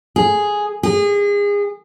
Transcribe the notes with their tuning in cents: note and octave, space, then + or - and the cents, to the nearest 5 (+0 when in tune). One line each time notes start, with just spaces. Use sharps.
G#4 +0
G#4 -30